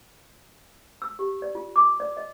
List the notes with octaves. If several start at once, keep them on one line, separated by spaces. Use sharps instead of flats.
E6
G4
D5
F4
D6
D5
D#5